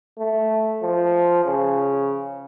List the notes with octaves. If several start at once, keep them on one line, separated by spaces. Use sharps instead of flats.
A3
F3
C#3